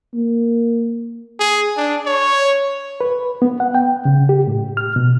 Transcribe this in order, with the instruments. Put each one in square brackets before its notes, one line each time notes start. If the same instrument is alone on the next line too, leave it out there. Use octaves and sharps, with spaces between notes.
[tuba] A#3
[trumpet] G#4
D4
C#5
[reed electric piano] B4
B3
F#5
G5
C#3
G4
A2
F6
B2